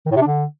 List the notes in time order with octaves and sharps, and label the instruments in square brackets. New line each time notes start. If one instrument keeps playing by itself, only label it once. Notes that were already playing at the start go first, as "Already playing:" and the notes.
[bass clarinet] D#3
A2
C3
D4
D3